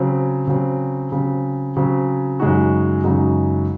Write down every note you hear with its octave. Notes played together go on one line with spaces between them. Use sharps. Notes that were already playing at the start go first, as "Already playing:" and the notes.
Already playing: C#3 F#3 C4
C#3 F#3 C4
C#3 F#3 C4
C#3 F#3 C4
F#2 C#3 G#3 D#4 F#4
F#2 C#3 G#3 D#4 F#4